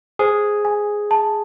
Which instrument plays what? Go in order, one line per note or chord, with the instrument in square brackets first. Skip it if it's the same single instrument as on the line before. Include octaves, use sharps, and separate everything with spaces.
[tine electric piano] G#4 [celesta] C5
[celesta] G#5
A5